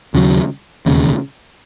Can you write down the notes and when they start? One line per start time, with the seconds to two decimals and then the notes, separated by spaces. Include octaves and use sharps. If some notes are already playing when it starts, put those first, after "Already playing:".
0.14 D#2 C#3 F#3
0.86 E1 D#2 C#3